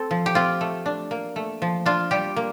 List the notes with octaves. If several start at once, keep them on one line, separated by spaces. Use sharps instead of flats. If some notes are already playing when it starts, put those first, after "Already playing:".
Already playing: C4 A4
F3
G4
C4 F4
A3
D4
A#3
A3
F3
D4 F4
G3 G4
A#3